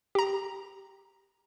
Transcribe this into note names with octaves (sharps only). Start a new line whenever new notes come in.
G4 A#5